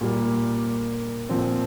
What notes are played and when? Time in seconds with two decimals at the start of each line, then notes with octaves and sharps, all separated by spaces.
0.01 A#2 G3 A#3
1.29 A#2 F3 C4